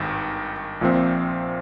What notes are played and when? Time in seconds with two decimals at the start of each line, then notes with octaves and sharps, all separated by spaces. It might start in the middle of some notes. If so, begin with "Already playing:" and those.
Already playing: G#1 G2 D#3
0.81 A#1 A#2 F3 C4